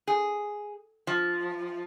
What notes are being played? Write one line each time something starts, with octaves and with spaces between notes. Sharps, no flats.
G#4
F3